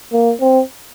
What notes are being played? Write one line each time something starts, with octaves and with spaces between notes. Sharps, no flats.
A#3
C4